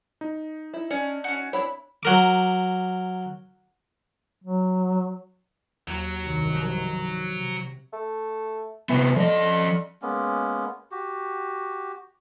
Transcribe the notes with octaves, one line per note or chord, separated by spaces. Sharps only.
D#4
E4
C#4 D4
C#4 F#4
C4 D4 E4 C#5
F#3 A#4 D6
F#3
D#2 F#3
C2 G2 D#3
F3
C3
A3
C3 E3 B3
D3 F3 D#5
G#3 A#3 B3 C#4
F#4 G4